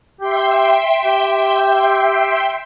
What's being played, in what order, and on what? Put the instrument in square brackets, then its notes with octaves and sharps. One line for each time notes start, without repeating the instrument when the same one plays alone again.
[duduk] G4 [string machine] E5 G5 C6
[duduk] G4